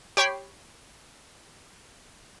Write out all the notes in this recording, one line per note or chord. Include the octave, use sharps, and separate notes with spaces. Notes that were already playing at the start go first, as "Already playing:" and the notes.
G4 C#5 G5 B5 C7